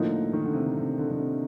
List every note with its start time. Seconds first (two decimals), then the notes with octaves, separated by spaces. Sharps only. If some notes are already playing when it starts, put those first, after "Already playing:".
Already playing: A2 D3 F3 A#3 D#4
0.33 D#3
0.44 D3
0.53 C3
0.64 D3
0.76 C3
0.98 D3
1.10 D3
1.18 C3